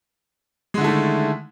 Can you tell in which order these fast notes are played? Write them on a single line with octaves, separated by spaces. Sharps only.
G#3 D3 E4 A3 D#3